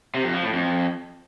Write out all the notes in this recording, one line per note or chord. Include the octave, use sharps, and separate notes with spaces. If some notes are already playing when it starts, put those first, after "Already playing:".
C3
F2
F3
A2
F2